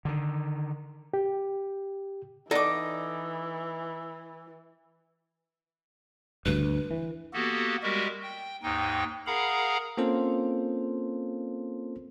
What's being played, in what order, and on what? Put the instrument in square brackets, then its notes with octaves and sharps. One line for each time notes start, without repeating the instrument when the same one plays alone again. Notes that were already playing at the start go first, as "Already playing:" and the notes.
[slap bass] D3 D#3
[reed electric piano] G4
[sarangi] E3 [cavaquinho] D#4 D6 [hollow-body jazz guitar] A4 D5 F#5
[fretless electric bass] D2 G2 [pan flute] B4
[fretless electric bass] E3
[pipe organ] A#3 B3 F#4 G4 A4
G3 G#3 F#4 G4 A#4 E5
G5
D#2 G#2 D#4 G5
G#4 A#4 F5 F#5 A#5 B5
[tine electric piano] A#3 C4 C#4 F4 A4 C5